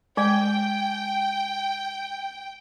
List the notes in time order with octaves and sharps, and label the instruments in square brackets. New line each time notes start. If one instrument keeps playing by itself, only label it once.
[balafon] G#3 [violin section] G5 [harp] G#5